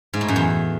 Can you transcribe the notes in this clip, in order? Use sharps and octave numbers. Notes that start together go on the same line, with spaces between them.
G#2
A2
F#2
E2